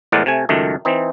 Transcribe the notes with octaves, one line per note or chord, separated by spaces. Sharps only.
E2 A2 G#3 A#4 D5 F#5
C3 A3 G#5
C#2 F#2 D#3 A3
E3 C4 D#4